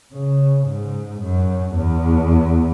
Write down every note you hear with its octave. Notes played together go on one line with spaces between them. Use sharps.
C#3
G#2
F#2
E2